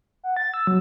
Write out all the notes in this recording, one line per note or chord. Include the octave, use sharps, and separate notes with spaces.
F#5
A6
E6
F#3